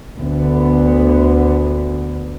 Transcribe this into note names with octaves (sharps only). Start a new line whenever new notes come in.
D2 D3 B3